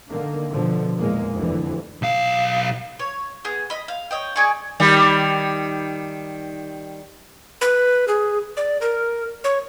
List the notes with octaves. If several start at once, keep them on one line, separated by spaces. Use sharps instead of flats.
D3 D#3 A#3
B2 D3 F3
E2 A#2 G#3 A#3
F1 D2 D3 E3
B1 F5
C#5
B3 G#4
D#5 B5
F5
C#5 D#5 G5
G#4 D5 G#5 C#6
D#3 G3
B4
G#4
D5
A#4
C#5